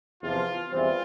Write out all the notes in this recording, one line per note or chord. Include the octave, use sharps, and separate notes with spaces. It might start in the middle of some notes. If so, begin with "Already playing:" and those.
E2 C3 F3 F4
E2 E3 G3 C4 F4